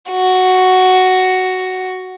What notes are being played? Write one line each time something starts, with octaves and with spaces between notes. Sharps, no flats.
F#4